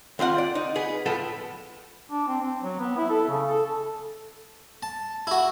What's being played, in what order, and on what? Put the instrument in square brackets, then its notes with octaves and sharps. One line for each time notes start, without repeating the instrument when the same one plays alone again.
[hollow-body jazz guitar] D#2 C4 F4 F#5
D5
D#4
B3 G#4
A2 F3 B3 A4
[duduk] D4
C4
C4
F#3
B3
E4
A4
C#3
A4
[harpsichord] A5
E4 F#4